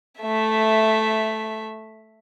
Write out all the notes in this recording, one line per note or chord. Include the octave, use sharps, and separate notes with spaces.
A3 E5